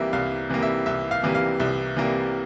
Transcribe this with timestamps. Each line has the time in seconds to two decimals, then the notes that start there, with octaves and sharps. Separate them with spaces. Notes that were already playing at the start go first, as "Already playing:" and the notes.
Already playing: C2 C3 E3 G3 A#3 E5
0.13 C2 F5
0.49 C3 E3 G3 A#3
0.62 E5
0.86 C2 E5
1.11 F5
1.23 C3 E3 G3 A#3
1.35 F5
1.60 C2 E5
1.96 C3 E3 G3 A#3